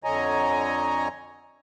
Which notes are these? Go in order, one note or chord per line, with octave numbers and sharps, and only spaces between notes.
F2 D3 C#5 D#5 G#5 A#5